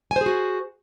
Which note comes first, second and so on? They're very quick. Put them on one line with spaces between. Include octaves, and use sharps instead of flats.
G#5 C5 G#4 F#4